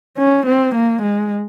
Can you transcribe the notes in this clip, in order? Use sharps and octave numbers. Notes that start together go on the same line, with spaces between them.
C#4
C4
A#3
G#3